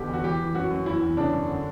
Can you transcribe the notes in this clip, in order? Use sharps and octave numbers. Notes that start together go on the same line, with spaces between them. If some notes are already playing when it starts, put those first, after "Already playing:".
Already playing: B2 D3 G4
E2
F#4
E3 G4
E3
F#2 F#4
F#2
E2 E4
E2
C#3 D4
F#2
D3